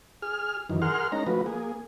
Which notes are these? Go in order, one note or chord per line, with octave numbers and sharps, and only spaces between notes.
G#4 F6
F#2 D#3 E3
G#4 A#4 F#5 C6 F6
G#3 C#4 D#4 A#5
F3 A3 F#4 B4
A#3 G#4